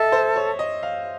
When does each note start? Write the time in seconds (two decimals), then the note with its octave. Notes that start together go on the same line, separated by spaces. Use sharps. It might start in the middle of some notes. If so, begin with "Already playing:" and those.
Already playing: A4 D#5 E5
0.12 C5
0.36 C#5
0.59 D#5
0.83 F5